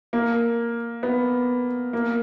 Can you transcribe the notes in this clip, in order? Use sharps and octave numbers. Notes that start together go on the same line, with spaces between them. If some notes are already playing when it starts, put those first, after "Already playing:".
A#3
B3
A#3